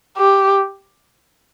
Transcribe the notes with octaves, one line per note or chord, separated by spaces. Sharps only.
G4